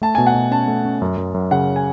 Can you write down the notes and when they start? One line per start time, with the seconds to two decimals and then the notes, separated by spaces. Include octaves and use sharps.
0.02 A3 A5
0.15 B2 G#5
0.26 F#5
0.34 B2
0.51 C#4 A5
0.68 A3
0.85 C#4
1.02 F#2
1.18 F#2
1.34 F#2
1.51 C#3 F#5
1.76 G#5